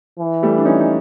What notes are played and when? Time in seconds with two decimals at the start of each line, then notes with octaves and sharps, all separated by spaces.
0.20 E3
0.43 G3 A3
0.58 D4
0.65 C#4 D#4
0.80 D#4